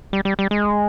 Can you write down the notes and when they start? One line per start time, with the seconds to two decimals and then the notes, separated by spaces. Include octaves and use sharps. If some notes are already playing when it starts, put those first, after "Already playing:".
0.13 G3
0.25 G3
0.39 G3
0.51 G#3